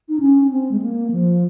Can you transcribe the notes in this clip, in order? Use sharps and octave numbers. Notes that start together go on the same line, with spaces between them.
D#4
C#4
C4
G#3
A#3
F3